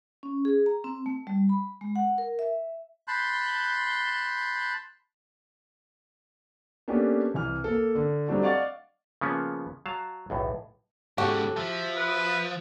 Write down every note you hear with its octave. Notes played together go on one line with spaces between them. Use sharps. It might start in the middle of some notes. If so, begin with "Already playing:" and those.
C#4
G#4
A#5
C4
A3
G3
B5
G#3
F#5
A#4
E5
A5 B5 C6 F#6 G6
A#3 B3 C#4 D4 G4 A4
C2 E3 F6
A#3 A4
D3
F#3 G3 A3 C4 D4 F#4
D5 D#5 F5 F#5 C#6 A6
C#3 F3 A#3 B3 C#4
F#3 F5 A5
B1 E2 A2
G#2 C#3 F#4 G4 A4
F3 E5
B4